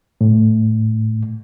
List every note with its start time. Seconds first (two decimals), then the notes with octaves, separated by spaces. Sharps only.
0.21 A2